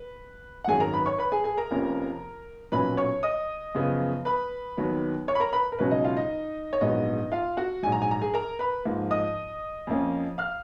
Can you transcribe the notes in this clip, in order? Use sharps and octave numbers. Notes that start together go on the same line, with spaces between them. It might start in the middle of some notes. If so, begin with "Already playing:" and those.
Already playing: B4
F#5
G#1 F#2 D#3 F#3 G#4 G#5
A#4 A#5
B4 B5
C#5 C#6
B4 B5
G#4 G#5
G#4 G#5
A#4 A#5
F1 F2 F3 A#3 C#4
B1 A#2 F#3 A#3 C#4 B4 B5
C#5 C#6
D#5 D#6
F#2 C#3 F3 B3
B4 B5
D#2 D#3 F#3 B3
C#5 C#6
B5
A#4 A#5
B4 B5
A#4
C#2 B2 F#3 C#4 B4
D#4 D#5
F4 F5
D#4 D#5
C#5
A#1 G#2 F#3 B3 D#4 D#5
F4 F5
F#4 F#5
A#1 G#2 F#3 G#5
A#5
G#5
A#5
G#4 G#5
A#4 A#5
B4 B5
G#2 F3 A#3
D#5 D#6
F2 F3 A#3 C#4
F5 F6